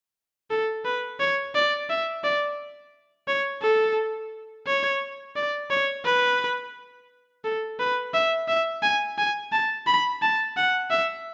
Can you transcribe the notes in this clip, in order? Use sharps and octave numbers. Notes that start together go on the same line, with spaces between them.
A4
B4
C#5
D5
E5
D5
C#5
A4
C#5
D5
C#5
B4
A4
B4
E5
E5
G#5
G#5
A5
B5
A5
F#5
E5